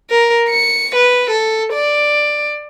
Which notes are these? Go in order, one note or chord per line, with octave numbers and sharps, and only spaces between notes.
A#4
C#7
B4
A4
D5